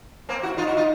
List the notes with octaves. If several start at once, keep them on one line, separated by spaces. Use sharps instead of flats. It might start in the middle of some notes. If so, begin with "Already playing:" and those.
A#3 C4
E4 F#4
D#4 F4
E4 F#4
D#4 F4